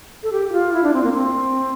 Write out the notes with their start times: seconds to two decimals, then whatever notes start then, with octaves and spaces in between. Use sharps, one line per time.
0.23 A4
0.32 G4
0.49 G4
0.53 F4
0.73 E4
0.83 D4
0.93 C4
1.03 A#3
1.13 C4